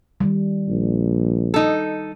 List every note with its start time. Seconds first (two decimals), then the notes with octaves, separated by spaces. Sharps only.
0.21 D#3 G3
0.69 A#1
1.54 D#4 A4